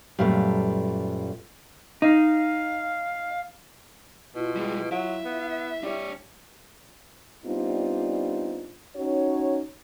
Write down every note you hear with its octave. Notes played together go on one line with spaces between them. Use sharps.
F#2 A#2 G3 A3 F4 B4
D#4 F5
B2 E4 F4
G3 G#3
F#3 E5
B3
G3 D4 C#5 E5
G3 B3 C4 D4 D#4 F4
C#4 D#4 F#4 C#5